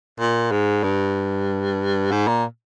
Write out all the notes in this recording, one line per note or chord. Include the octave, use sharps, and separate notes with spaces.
A#2
G#2
G2
G#2
A#2